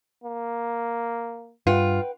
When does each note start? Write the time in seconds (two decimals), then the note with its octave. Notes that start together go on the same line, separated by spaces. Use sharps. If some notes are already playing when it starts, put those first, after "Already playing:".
0.23 A#3
1.67 G2 F4 B4 F#5 G5